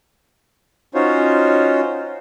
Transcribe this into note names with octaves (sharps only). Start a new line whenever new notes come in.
C#4 D#4 F4 F#4 C5 C#5